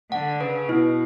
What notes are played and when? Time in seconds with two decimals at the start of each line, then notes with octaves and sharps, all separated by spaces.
0.11 D3 F#5
0.40 C#3 B4
0.69 B2 E4